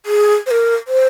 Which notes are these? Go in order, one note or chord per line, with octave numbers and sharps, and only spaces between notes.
G#4
C5
A#4
C5